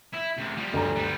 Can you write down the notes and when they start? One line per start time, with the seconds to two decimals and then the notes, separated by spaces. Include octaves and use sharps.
0.13 E4
0.37 D2 C3
0.57 F3 G3
0.73 D2 G2 A#5
0.95 G3 B3